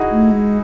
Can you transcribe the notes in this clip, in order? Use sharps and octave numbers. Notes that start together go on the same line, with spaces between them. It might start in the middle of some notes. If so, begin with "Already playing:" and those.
Already playing: D#4 E4 F#4 G#4
A3
G#3